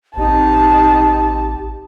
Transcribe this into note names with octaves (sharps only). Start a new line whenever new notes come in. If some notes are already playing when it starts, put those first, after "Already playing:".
A1 C4 D#4 G4 A5